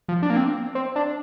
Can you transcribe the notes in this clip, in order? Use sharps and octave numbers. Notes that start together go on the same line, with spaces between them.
F3
D4
A#3
C4
C4
D4